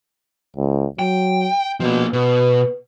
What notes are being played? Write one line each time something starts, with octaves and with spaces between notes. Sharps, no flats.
C#2
F#3 G5
B2 F3 A#3
B2 B4